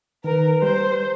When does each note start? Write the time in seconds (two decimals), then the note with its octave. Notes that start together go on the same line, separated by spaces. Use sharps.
0.24 D#3 A#4 B4
0.63 G3 C5